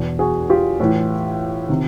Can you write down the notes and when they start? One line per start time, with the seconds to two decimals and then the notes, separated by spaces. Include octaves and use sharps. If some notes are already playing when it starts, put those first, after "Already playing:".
Already playing: E2 B2
0.19 F#4 G#4
0.50 F4 G4
0.80 A2 E3
1.69 C3 D#3